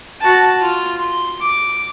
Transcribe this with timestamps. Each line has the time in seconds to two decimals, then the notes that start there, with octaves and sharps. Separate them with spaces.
0.20 F#4 A5
0.61 F4
0.97 C6
1.40 D6